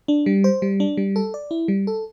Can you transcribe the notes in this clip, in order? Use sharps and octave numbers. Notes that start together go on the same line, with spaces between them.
D4
G3
C5
G3
D4
G3
A4
D5
E4
G3
A4